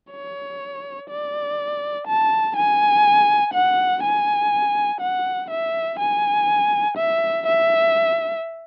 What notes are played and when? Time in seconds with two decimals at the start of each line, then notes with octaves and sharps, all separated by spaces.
0.11 C#5
1.10 D5
2.07 A5
2.56 G#5
3.54 F#5
4.03 G#5
5.01 F#5
5.50 E5
6.00 G#5
6.97 E5
7.47 E5